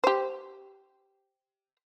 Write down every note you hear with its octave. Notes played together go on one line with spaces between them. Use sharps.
G4 C5